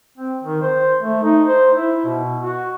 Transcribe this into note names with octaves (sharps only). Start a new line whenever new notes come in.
C4
D#3
C5
A3
D#4
C5
E4
B2
F#4